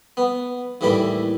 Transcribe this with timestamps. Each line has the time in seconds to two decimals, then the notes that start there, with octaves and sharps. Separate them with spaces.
0.17 B3
0.81 D#2 A2 E3 G3 B5 D6